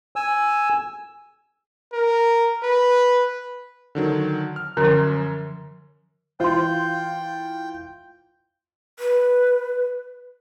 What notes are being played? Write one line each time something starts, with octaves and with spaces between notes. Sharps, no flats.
G#5 E6
A#4
B4
D3 D#3 F#3
F6
F#2 D3 F3
E3 F4 C5 F5 G5 C6
B4